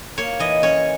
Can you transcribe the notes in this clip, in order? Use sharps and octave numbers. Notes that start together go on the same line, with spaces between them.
A#3 C#5
E3 D#5
C#4 C#5